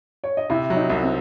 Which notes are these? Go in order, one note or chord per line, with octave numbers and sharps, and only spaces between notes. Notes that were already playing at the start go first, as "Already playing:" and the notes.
C#5
D#5
C3 E4 E5
F#3
D#4 D#5
C2
C4 C5